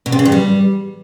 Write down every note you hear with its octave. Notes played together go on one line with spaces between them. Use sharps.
B2
C3
C#3
G2
G3